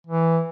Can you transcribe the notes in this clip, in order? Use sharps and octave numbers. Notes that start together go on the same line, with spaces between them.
E3